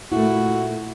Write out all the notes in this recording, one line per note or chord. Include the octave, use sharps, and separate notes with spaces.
A#2 A3 E4 F#4